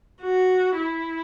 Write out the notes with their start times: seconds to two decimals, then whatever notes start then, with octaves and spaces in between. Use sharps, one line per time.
0.21 F#4
0.79 E4